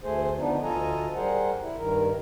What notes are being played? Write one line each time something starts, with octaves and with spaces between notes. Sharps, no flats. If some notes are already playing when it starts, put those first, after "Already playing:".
D2 A3 G#4 C5
D3 F3 B3 D4 D#4
D2 F4 A4 D#5 G#5 A#5
G3 G#4 A#4 C5 F#5
E4
G2 D#3 A#4